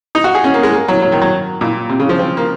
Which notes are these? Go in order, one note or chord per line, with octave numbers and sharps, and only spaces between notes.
D#4
F#4
G#4
C#4
A#3
G#3
A#3
F#3
F#3
D#3
F#3
A#2
C3
C#3
F3
C4
A#3